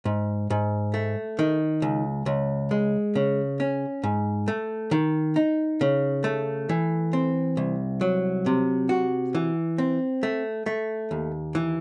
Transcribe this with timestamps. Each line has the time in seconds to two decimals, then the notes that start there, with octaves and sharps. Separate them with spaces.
0.05 G#2
0.50 G#2
0.94 A3
1.39 D#3
1.82 C#2
2.26 C#2
2.71 G#3
3.15 C#3
3.60 C#4
4.03 G#2
4.48 A3
4.91 D#3
5.36 D#4
5.81 C#3
6.24 A3
6.69 E3
7.13 C4
7.57 C2
8.01 F#3
8.46 C3
8.89 F#4
9.35 E3
9.78 C4
10.23 A3
10.66 A3
11.11 D#2
11.55 E3